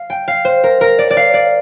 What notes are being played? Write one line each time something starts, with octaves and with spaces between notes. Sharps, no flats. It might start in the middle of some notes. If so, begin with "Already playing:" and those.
Already playing: F5
G5
F5
C5
A#4
A#4
D5
D5
F5
D5